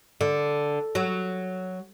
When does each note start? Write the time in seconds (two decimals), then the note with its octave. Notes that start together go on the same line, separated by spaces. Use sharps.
0.21 D3
0.95 F#3